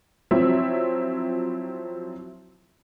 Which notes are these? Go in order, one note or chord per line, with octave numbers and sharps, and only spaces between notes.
F3 F#3 C4 E4 C#5 E5